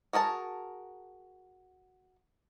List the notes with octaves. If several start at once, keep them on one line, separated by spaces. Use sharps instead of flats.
F#4 G#4 A#4 A5